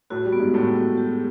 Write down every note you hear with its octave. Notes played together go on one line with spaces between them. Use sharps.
A2 A3 F#4
G3
B3
G#2 G#3
A2 A3 B3
B3
G4